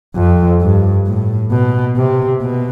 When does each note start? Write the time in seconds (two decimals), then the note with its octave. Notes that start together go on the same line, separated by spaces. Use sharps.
0.16 F2
0.61 G2
1.07 A2
1.51 B2
1.96 C3
2.42 B2